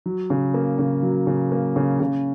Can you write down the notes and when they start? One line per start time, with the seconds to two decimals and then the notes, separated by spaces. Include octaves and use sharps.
0.06 F#3
0.30 C#3
0.54 A#3
0.79 C#3
1.03 F#3
1.27 C#3
1.52 A#3
1.76 C#3
2.00 C#3